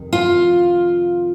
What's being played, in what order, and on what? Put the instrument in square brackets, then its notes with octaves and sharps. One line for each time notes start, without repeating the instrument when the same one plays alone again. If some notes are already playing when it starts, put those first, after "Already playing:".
Already playing: [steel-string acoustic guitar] F2 C3 D#3
F4